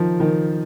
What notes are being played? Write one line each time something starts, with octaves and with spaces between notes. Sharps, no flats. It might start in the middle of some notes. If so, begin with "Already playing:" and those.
Already playing: D#3 F3
D#3